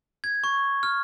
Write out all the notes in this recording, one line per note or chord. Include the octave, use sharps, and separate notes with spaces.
G#6
C#6
F6